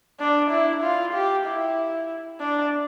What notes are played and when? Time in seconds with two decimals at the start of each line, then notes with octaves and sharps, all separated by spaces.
0.20 D4
0.51 E4
0.83 F4
1.14 G4
1.46 E4
2.40 D4